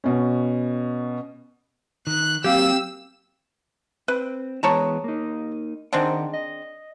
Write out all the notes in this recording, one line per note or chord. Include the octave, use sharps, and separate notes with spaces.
B2 C#4
D#3 F#6
F#3 A#3 C4 G4 F5 E6
C4 B4
E3 G#3 B3 C#5 A5 A#5
A#3 D#4
D#3 G#3 C4 D4 D#4 F#5
D#5